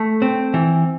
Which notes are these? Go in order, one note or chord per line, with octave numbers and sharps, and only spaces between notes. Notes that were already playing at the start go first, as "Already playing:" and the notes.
Already playing: A3
C4
E3